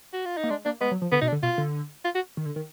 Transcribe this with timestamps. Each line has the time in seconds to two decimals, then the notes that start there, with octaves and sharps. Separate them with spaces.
0.13 F#4
0.25 F4
0.37 D#4
0.44 A#3
0.50 G#3 D4
0.65 A#3 D4
0.81 G#3 B3
0.91 F#3
1.02 F3
1.12 D3 B3
1.21 B2 D#4
1.27 D4
1.32 D3
1.43 B2 F4
1.58 D3
2.05 F4
2.15 F#4
2.37 D#3
2.45 D3
2.56 D#3